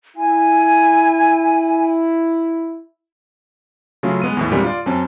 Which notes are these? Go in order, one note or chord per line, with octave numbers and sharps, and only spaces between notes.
E4 G#5
C#3 F#3 A3 C#4 F4
G#3 B3 D#7
E2 A2 E3
A#2 D3 G3 G#3 C4 A#4
F4 D5
F#2 C4 C#4 A5